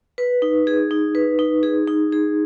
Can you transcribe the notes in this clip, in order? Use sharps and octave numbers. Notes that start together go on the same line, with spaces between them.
B4
D#4
G#4
D#4
B4
D#4
G#4
D#4
G#4